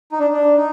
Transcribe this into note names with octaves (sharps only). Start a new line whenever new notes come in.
D#4
D4
D4
D#4